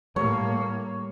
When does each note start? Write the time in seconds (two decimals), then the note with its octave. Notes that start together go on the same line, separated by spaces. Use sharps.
0.16 A2 G3 A#3 C#5